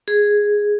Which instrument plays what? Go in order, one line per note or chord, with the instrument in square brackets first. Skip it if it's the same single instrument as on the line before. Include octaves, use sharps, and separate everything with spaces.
[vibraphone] G#4